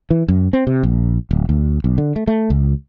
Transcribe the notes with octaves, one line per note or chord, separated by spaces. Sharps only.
E3
F#2
C4
C3
A#1
D1
D2
B1
D3
A3
A3
C#2